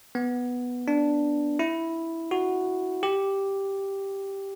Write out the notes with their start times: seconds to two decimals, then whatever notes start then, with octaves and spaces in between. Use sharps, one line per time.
0.15 B3
0.88 D4
1.59 E4
2.31 F#4
3.03 G4